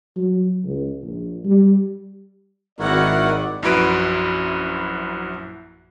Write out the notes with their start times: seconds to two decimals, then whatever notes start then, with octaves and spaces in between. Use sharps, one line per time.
0.16 F#3
0.65 C#2
1.03 A#1
1.45 G3
2.79 G#1 D#3 E4 F#4 A#4 D5 F#5
3.63 A#1 F#2 E4 F#4 B4 D7